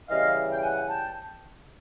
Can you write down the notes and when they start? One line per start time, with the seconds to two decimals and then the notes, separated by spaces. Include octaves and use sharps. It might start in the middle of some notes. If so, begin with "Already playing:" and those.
0.09 C#3 E3 G3 D#5 F5
0.51 G5
0.63 F#5 G#5
0.89 G5 A5